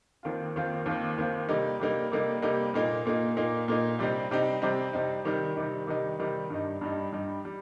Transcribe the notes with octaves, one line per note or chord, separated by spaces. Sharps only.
D#2 D#3 C4 F4
D#2 D#3 C4 F4
D#2 D#3 C4 F4
D#2 D#3 C4 F4
C3 G3 A#3 D#4
C3 G3 A#3 D#4
C3 G3 A#3 D#4
C3 G3 A#3 D#4
A#2 A#3 D#4
A#2 A#3 D#4
A#2 A#3 D#4
A#2 A#3 D#4
C3 G3 C4 D#4
C3 G3 C4 D#4
C3 G3 C4 D#4
C3 G3 C4 D#4
C3 D#3 G3 D#4
C3 D#3 G3 D#4
C3 D#3 G3 D#4
C3 D#3 G3 D#4
G2 G3 D#4
G2 G3 D#4
G2 G3 D#4
G3